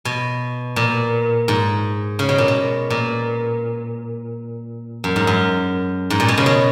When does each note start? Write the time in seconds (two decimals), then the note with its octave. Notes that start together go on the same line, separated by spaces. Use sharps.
0.05 B2
0.76 A#2
1.48 G#2
2.19 C#3
2.29 B2
2.38 A#2
2.48 B2
2.90 A#2
5.04 F#2
5.16 G#2
5.27 F#2
6.10 G#2
6.20 A#2
6.28 B2
6.38 C#3
6.46 B2